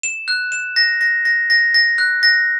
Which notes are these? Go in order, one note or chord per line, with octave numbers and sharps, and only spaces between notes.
E7
F#6
E7
A#6
A#6
A#6
A#6
A#6
F#6
A#6